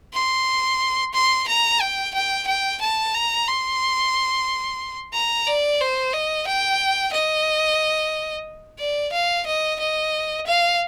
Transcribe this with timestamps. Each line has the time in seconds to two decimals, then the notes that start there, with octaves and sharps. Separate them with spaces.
0.14 C6
1.14 C6
1.48 A#5
1.81 G5
2.14 G5
2.47 G5
2.81 A5
3.14 A#5
3.48 C6
5.14 A#5
5.47 D5
5.80 C5
6.13 D#5
6.47 G5
7.13 D#5
8.79 D5
9.12 F5
9.47 D#5
9.80 D#5
10.47 F5